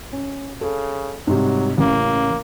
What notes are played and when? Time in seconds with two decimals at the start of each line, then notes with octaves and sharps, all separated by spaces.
0.13 C#4
0.61 C#3 A4
1.27 G#2 C3 F#3 G3
1.78 A1 C#3 A#3